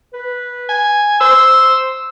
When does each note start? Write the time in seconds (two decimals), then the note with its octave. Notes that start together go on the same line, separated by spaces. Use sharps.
0.13 B4
0.69 G#5
1.21 C5 E6